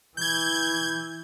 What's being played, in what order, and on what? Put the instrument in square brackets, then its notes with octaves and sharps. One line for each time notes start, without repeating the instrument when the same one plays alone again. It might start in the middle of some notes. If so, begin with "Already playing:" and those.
[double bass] E3 [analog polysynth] G6 G#6